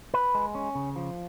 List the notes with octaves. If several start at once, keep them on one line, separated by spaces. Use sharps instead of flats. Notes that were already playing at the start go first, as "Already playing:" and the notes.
B4
G#3
C#4
C#3
F3